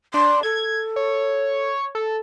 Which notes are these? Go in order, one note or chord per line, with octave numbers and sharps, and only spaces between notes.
D4 C6
A4 G#6
C#5
A4